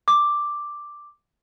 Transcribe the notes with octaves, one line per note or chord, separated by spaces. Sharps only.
D6